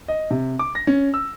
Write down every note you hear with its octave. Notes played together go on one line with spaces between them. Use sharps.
D#5
C3
D6
A#6
C#4
E6